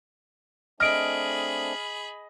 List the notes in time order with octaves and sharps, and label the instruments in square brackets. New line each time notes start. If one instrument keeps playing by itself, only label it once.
[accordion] A3 C4 D4 [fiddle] G#4 B5 [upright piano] D#5 [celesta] F6 D7